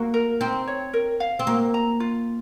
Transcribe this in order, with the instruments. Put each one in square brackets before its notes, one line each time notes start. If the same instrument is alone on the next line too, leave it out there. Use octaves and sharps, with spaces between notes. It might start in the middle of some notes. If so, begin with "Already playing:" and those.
Already playing: [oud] A#3 [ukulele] F#4
[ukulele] A#4
[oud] C4 [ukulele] D#4
[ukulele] C#5
A#4
F5
[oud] C4
[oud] A#3 [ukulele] F#4
[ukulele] A#5
F4